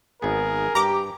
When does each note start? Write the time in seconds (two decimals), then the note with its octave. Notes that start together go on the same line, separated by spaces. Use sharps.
0.22 G#1 B3 G#4 A#4
0.75 G2 G4 A#5 D6